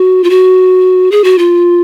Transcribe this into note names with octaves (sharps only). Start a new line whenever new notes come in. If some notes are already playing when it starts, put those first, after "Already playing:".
Already playing: F#4
F4
F#4
G#4
F#4
F4